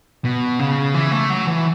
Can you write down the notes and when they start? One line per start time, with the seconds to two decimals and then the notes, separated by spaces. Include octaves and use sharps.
0.25 B2
0.59 C#3
0.94 E3
1.12 A3
1.30 F#3
1.47 E3